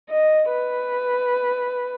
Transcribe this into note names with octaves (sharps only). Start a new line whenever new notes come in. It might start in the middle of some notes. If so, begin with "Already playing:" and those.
D#5
B4